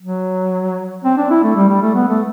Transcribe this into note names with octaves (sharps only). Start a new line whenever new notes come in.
F#3
C4
D4
E4
A3
G3
G3
A3
B3
A3